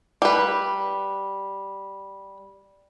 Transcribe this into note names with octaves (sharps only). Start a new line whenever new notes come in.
G3 B4